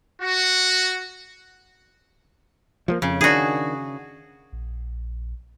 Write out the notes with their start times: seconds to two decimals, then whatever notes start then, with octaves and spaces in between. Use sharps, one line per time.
0.22 F#4
2.88 F3 F#3 A#3
3.02 F2 C#3
3.21 D#3 D4 F#4 G#4
4.53 A#1